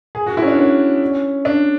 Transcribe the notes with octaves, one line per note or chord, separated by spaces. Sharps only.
G#4
F#4
E4
C#4
D4
C#4
D4